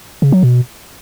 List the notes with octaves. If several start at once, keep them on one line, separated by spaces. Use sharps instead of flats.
C#3
F#3
B2